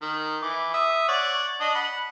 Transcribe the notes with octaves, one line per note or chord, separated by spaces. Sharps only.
D#3
E3 D6
E5 D#6
C#5 D5 F#5
D4 D#5
F#5 B5